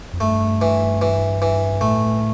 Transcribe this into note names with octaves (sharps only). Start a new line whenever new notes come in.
F2
G2 A3
E3
E3
E3
A2 A3